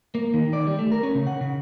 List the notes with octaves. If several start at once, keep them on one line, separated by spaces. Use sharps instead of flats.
A#3
D#3
D5
G3
A3
A#4
C#4
C#3
F#5
C#3